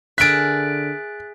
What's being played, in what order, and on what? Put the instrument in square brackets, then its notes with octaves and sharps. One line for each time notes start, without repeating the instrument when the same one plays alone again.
[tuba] D3 [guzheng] G#4 A#4 E5 [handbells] F#6 A6 [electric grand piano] B6 D7